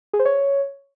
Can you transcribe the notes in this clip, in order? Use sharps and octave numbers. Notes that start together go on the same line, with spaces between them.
G#4
C5
C#5